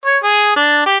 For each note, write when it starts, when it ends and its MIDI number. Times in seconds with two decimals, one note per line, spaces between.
0.05 0.18 73
0.23 0.53 68
0.56 0.81 62
0.86 0.97 67